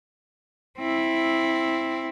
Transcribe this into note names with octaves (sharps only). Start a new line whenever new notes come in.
C4 E4